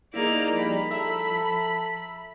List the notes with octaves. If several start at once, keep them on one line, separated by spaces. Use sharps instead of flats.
A#3 D#4 E4 G#4 D5 F6
F3 G3 B5
A4 E5 A#5 E6